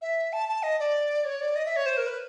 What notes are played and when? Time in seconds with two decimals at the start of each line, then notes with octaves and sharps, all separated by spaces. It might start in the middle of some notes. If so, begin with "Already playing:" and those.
0.02 E5
0.33 A5
0.49 A5
0.63 D#5
0.80 D5
1.25 C#5
1.41 D5
1.56 D#5
1.65 E5
1.76 C#5
1.86 C5
1.97 A#4
2.07 B4